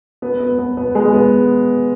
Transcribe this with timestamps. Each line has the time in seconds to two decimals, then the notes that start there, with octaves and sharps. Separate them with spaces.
0.22 B3
0.40 B3
0.58 B3
0.77 B3
0.95 G#3
1.13 B3